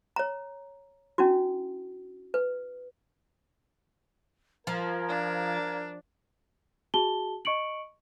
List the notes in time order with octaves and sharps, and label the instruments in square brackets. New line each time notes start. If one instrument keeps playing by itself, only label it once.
[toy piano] C#5 A#5
C#4 D4 E4 F#4
B4
[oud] F3 [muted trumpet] A#4 [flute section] F5 A#5 G#6
[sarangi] D4
[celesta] F#4 G#4 A5 G7
D#5 C#6 C#7 D7 F#7